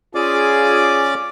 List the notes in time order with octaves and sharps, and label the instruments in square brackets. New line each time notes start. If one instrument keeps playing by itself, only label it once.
[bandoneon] C#4 D5 D6 [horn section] F4 G#4